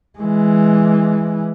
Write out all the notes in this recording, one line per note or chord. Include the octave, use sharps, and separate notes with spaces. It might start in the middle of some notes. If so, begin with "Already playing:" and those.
E3 G#3